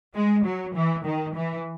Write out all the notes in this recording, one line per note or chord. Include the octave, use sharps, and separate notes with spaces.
G#3
F#3
E3
D#3
E3